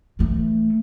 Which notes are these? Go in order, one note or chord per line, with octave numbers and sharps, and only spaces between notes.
E3 A3